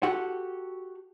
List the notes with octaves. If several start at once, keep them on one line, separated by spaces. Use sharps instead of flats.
F#4 G4 A4 F#5